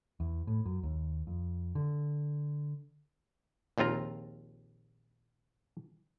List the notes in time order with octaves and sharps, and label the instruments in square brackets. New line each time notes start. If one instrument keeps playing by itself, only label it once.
[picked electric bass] E2
A2
F#2
D#2
F2
D3
[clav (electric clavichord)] A#1 D#2 C4 F4 A#5